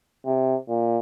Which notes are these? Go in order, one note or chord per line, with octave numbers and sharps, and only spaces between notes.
C3
A#2